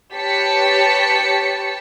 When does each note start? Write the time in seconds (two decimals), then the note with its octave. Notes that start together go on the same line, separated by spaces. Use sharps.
0.14 G4 B4 C#5 A5 B6 C#7